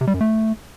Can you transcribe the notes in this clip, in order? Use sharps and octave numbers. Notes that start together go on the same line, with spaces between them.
C3
G3
F#2
A3